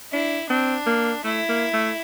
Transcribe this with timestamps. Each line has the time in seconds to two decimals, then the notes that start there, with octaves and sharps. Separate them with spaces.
0.13 D4 E4
0.50 C4 D4
0.87 A#3
1.24 A3 E4
1.49 A#3
1.74 A3